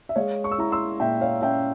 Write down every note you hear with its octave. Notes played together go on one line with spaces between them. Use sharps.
E5
G#3 C#5 F5
C#6
E6
E4 A#5 C#6
C6 E6
A#2 E5 G5
C#5 F5
C#4 E5 G5